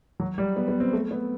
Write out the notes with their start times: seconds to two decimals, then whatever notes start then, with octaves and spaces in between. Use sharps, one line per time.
0.20 F#3
0.38 G3
0.56 B3
0.68 B3
0.80 C4
0.93 A3
1.11 B3